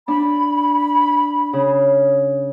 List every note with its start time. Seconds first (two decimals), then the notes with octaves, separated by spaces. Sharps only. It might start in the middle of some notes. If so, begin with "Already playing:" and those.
0.08 D4 B5
1.53 C#3